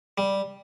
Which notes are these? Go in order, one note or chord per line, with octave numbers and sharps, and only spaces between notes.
G3